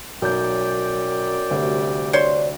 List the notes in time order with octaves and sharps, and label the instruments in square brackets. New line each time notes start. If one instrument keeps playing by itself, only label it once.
[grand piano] B1 G6 [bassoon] F#2 [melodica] D5 G5
[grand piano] D2 C3 G3
[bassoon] D4 [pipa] C5 C#5 C6